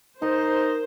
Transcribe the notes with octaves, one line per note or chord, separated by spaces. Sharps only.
D#4 A#4 C5